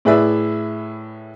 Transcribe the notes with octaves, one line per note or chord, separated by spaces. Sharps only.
A2 E4 G#4 B4 D5 E5